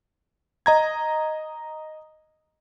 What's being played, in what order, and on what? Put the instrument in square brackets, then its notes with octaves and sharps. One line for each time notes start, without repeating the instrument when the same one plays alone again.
[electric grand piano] D#5 A#5 G#6